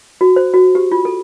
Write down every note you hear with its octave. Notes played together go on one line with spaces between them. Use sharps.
F#4
C5
F#4
G4
F4
A4